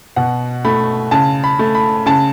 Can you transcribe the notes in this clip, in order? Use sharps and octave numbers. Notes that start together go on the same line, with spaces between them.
B2 F#5
A3 B5
C#3 A5
B5
A3
B5
C#3 A5